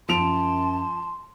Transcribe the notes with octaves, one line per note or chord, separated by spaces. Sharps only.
F#2 F3 A5 C6 D7 F7